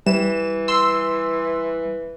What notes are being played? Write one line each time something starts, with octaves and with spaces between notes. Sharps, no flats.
E3 G3 E7
C6 E6